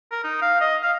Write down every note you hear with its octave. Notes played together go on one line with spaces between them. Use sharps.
A#4
D#4
F5
D#5
F5